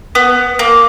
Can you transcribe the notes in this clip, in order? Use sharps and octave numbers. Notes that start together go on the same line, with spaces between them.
B3
A#3